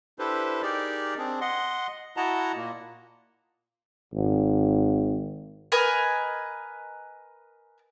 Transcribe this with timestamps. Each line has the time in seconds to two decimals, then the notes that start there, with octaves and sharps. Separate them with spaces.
0.19 D4 E4 G4 A4 B4 C5
0.62 D#4 G4 G#4 A#4 D5
1.18 C4 D4 G#4
1.41 D#5 F#5 C6
2.17 E4 F#4 D#5 F#5 A5 A#5
2.56 A#2 A#3
4.14 G#1
5.72 A#4 B4 D#5 G#5